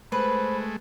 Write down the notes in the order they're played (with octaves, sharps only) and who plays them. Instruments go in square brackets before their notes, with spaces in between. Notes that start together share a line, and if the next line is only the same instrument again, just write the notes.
[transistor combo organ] G#3 A3 [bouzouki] B4 [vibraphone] C5 [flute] B5